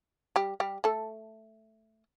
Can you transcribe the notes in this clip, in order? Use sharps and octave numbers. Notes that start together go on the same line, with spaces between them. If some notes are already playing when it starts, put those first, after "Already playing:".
G3 G4
G3 G4
A3 A4